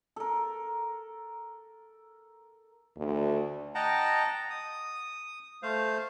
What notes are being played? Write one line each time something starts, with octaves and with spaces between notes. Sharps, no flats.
A4 A#4
D2
D#5 F#5 G5 A5 A#5
D#6
A3 C5 F5